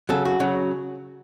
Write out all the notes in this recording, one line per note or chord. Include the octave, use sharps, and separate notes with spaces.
C#3 F#3 A4
F#4
C#3 F#3